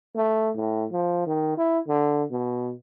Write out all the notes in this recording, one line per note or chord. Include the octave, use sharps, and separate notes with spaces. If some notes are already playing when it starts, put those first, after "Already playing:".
A3
A2
F3
D#3
E4
D3
B2